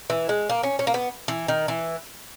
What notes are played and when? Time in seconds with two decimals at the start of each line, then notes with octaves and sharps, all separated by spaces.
0.10 E3
0.29 G#3
0.49 A#3
0.63 C#4
0.79 C#4
0.87 A#3
0.94 B3
1.28 E3
1.48 D#3
1.68 E3